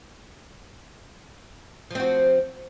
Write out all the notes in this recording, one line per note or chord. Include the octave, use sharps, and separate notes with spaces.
F3 C4 F#4